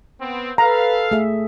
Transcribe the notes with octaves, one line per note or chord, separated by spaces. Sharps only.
B3 C4
A4 B4 F5 A#5
A3 G#4 E5